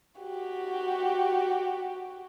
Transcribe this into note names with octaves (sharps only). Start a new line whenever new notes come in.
F#4 G4